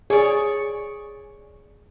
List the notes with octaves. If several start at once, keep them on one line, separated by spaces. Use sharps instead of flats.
G#4 C#5 D5